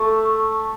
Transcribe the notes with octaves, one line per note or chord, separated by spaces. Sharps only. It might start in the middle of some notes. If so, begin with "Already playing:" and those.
Already playing: A3